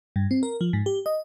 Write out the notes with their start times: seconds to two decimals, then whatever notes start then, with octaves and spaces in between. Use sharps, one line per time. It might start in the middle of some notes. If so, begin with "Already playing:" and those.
0.16 G2
0.31 C4
0.43 A#4
0.61 F3
0.73 G#2
0.86 G4
1.06 D#5